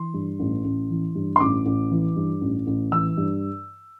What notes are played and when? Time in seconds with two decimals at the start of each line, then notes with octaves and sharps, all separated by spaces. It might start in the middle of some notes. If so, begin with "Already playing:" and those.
Already playing: E3 C6
0.14 G2
0.39 A1
0.64 A1
0.90 E3
1.15 G2
1.36 C6
1.40 A1 D6
1.66 A1
1.91 E3
2.16 G2
2.41 A1
2.67 A1
2.92 E3 E6
3.17 G2